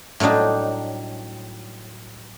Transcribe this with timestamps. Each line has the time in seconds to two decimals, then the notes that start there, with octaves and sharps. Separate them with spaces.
0.20 A2 F#3 G3 D4 D#4